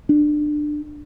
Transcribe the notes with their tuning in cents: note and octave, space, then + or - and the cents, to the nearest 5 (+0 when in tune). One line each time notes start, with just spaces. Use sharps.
D4 +20